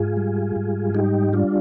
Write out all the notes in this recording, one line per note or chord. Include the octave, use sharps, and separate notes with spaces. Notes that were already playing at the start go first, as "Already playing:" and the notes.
Already playing: G#2 F4 G#4
G3
G#2
G3 D#4 G4
G3 D4 F4